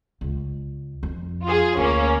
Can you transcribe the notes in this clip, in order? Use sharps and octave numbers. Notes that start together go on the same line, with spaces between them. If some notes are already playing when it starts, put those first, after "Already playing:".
C#2
F2
F4 G#4
D2 A#3 C#4